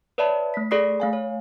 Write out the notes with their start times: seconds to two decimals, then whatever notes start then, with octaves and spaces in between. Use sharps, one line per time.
0.18 B4 C#5 D5 E5 A5 B5
0.54 A3 B6
0.71 G#4 A4 D5 B5 D#6 C7
1.00 A3 F5 G#5
1.13 C#5